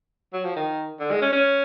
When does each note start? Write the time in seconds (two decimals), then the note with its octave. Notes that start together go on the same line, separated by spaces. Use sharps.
0.33 F#3
0.44 F3
0.56 D#3
1.00 D3
1.11 G#3
1.22 C#4
1.33 C#4